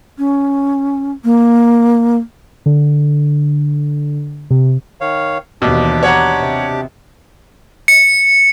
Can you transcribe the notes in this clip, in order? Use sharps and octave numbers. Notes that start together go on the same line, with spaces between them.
C#4
A#3
D3
C3
D#3 C#5 F5
D#2 B2 E3 D4 G4 D6
C#5 F#5 A#5
C3
C#7